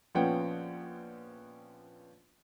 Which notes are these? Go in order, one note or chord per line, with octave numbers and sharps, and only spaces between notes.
A#1 F3 B3 C#4 F#5 G5